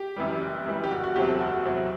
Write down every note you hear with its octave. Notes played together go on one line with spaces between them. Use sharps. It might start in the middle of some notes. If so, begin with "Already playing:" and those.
Already playing: G4
F#2 E3 G3
F#1
F#2 E3 G3
G4
F#1 F#4
F#4
E2 C3 F#3 C4 G4
A4
F#1 F#4
E2 C3 F#3 C4